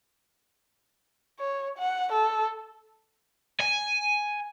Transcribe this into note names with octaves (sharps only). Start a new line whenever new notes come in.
C#5
F#5
A4
G#5